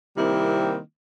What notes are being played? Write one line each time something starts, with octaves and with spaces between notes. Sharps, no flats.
C3 D#3 G3 A#3 C4 E4